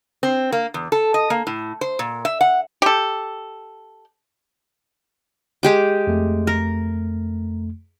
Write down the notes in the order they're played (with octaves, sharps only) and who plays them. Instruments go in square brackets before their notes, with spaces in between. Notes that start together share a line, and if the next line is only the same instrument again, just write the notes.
[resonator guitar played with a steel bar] C4
A#3
E2
A4
D#5
A#3
A2
C5
A#2
E5
F#5
[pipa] G4 A4
[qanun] G#3 G4 D6
[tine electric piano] F2 A3
[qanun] A#4